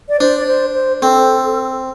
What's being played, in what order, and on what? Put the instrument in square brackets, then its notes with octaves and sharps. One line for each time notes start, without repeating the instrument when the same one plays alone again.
[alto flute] D5
[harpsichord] D4 [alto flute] C5
[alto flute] D5
C5
C5
[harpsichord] C4 [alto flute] A4